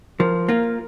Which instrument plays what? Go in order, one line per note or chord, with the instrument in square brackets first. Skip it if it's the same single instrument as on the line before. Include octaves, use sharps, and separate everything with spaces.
[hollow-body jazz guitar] F3 [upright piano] A#4
[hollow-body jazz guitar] A#3 F4